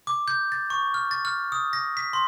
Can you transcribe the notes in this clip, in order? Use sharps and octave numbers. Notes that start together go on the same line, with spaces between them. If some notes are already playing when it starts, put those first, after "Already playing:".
D6
G6
A6
C#6
F6
A6
F6
D#6
A#6
B6
C6